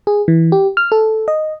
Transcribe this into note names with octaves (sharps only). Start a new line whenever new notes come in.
G#4
E3
G4
F6
A4
D#5